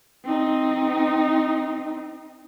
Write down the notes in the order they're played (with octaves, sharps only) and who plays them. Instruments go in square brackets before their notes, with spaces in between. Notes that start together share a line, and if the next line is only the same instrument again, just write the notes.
[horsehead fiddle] C4 D#4